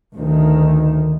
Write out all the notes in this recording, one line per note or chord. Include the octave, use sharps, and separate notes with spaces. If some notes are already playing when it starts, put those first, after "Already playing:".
D2 D#3